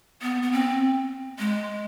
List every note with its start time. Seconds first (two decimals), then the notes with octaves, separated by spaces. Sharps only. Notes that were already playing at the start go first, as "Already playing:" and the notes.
0.22 B3
0.42 B3
0.52 C4
1.39 G#3